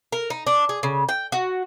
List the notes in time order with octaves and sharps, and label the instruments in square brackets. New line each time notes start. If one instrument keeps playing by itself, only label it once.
[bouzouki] A#4
D#4
D4
G#4
C#3
G5
F#4